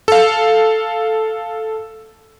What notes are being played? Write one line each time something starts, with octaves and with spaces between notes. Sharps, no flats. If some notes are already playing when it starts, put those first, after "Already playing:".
A4 F5